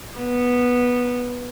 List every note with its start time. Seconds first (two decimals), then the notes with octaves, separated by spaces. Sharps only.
0.17 B3